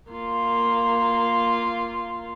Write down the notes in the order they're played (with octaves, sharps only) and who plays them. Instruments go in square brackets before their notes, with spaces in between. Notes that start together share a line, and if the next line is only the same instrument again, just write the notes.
[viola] A#3 F4